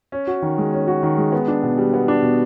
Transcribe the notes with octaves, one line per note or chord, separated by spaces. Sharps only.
C#4
F#4
D#3
G#3
C#4
F#4
D#3
G#3
B3
D4
B2
G3
B3
D4
B2